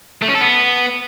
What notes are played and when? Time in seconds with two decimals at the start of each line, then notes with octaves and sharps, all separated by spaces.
0.22 A3
0.28 C#4
0.34 A4
0.41 B3